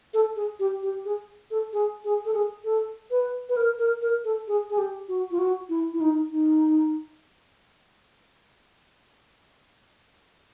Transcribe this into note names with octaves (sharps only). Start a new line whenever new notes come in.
A4
G#4
G4
G4
G#4
A4
G#4
G#4
A4
G#4
A4
B4
B4
A#4
A#4
A#4
A4
G#4
G#4
G4
F#4
F4
F#4
E4
E4
D#4
D#4